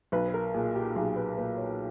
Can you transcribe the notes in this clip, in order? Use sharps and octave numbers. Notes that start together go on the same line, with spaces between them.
B1 B4
B4
A#4
A#2 G#4
G4
B1 G#4
B4
A#2 B4
C#5